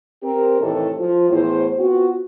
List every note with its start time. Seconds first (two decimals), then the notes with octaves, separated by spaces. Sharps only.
0.23 C4 G4 A#4
0.61 A2 C3 D#3 E3 A4 C#5
0.98 F3
1.30 E2 A2 C5
1.78 B3 C4 F4 F#4